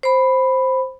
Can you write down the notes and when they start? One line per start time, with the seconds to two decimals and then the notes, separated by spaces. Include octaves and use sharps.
0.03 C5 B5